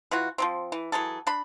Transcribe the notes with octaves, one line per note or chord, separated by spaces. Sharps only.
E3 F4 F#4
F3 F#3 C4
E3
E3 F#3 G#4 A4
D4 B5